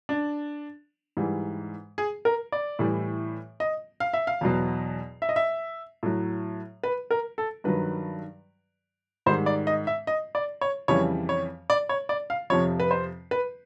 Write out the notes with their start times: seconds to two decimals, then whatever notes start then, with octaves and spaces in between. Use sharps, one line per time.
0.09 D4
1.17 G#2 E3 G3
1.98 G#4
2.25 A#4
2.52 D5
2.79 A2 E3 G3
3.60 D#5
4.00 F5
4.13 E5
4.27 F5
4.41 E2 B2 F#3
5.22 E5
5.29 D#5
5.36 E5
6.03 A2 F#3
6.83 B4
7.11 A#4
7.38 A4
7.64 G2 D#3 F#3 B4
9.26 G#2 D#3 G3 C5
9.46 D5
9.67 D#5
9.87 E5
10.07 D#5
10.35 D5
10.61 C#5
10.88 F2 C#3 E3 G3 C#5
11.29 C#5
11.70 D5
11.89 C#5
12.09 D5
12.30 F5
12.50 F2 C3 F3 C#5
12.80 B4
12.91 C5
13.31 B4